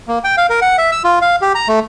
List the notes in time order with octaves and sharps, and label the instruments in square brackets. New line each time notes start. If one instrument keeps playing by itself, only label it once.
[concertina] A#3
G5
F5
A#4
F#5
E5
E6
F4
F5
G4
A#5
A3